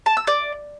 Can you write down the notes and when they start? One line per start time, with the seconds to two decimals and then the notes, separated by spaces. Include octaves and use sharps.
0.06 A5
0.17 E6
0.27 D5